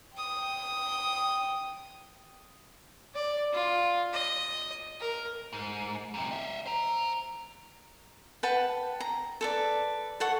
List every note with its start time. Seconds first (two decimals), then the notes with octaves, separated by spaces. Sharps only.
0.15 G5 D#6
3.15 D5
3.53 F4
4.13 D#5
5.01 A#4
5.53 G#2
6.14 F#2 C3
6.31 D#5 E5
6.66 C5 A#5
8.43 B4 F#5 G5 A5
9.00 A#5
9.41 A4 B4 D5
10.20 A4 F#5 C#6